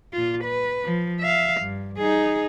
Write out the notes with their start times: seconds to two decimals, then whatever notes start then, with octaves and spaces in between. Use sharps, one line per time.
0.13 A#2 F4
0.44 B4
0.84 F3
1.20 E5 F5
1.61 G2
1.97 D#4 G#4